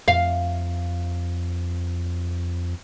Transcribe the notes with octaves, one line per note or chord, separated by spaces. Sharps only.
F2 F5